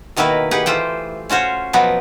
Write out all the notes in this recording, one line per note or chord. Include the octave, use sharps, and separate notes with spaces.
B2 D#3 A#3 E4 B4
G4 G#4 B4 F#5
E3 A3 F4 C5 G5
C#4 F4 F#4 C5 C#5
B2 F3 F#3 B3 B4 G5